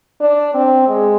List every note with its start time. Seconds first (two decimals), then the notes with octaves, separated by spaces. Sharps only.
0.21 D4
0.54 C4
0.88 G#3